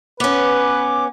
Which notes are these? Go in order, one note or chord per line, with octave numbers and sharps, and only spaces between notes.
B3 C#4 B4 D6